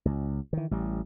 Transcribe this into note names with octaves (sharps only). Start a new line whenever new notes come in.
C#2
D#3 E3
A1 G3